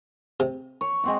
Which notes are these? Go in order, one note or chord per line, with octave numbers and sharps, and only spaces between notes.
C3
C#5
G#3 C4 F#4